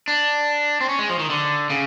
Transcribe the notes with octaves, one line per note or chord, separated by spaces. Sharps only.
D4
C4
C#4
G#3
F3
D#3
D3
C#3